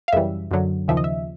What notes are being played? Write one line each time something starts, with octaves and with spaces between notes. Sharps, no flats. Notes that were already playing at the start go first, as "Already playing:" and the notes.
F5
F#2 C#3 E3 G3 E5
F#2 D3 F#3
D#2 C#3 F3 E5
D#5
E5